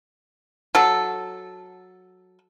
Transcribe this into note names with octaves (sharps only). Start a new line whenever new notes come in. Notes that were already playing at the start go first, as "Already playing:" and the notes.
F#3 A4